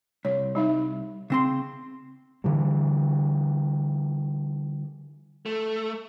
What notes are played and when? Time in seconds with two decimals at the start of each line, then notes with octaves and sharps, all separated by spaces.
0.25 C2 C#5
0.55 G3 D#4 E5
1.30 C#3 C4 C6
2.44 D3 E3 G3
5.46 A3